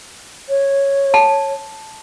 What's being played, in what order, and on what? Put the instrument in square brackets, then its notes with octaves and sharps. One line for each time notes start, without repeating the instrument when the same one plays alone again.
[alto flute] C#5
[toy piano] A5